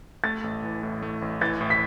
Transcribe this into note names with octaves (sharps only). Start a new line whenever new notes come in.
A3 A6
A1
E3
A2
A3
A1
E3 A6
A2
B6